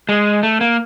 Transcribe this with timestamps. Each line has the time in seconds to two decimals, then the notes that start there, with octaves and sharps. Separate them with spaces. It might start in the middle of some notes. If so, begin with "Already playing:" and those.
0.09 G#3
0.43 A3
0.61 A#3